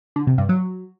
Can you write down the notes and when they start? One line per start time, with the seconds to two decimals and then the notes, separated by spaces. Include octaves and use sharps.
0.16 D3
0.27 C3
0.38 G2
0.49 F#3